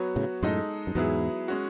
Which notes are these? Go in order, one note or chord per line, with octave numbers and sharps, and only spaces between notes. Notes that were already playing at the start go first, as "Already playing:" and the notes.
Already playing: F#3 B3 F#4 C#5
A2 C#3
F#2 A2 G#3 D#4 A4 D#5
F#2
E2 G#2 F#3 B3 E4 G#4
G#3 C#4 F#4